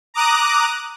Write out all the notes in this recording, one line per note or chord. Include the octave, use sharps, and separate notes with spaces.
A#5 D6 D#6 F#6